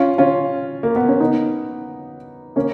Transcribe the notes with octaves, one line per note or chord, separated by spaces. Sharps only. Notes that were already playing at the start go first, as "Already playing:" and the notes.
Already playing: C#4 F4
C#4 F4
A#3
B3
C#4
B3 D#4
A#3 C#4